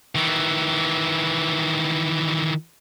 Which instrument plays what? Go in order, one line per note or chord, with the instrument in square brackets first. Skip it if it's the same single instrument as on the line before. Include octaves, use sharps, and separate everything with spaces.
[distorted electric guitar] D#3 E3